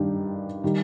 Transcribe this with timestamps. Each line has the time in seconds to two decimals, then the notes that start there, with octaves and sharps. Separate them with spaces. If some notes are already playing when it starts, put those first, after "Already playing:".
Already playing: G2 D#3 G3 D4 G4
0.63 D#3 G3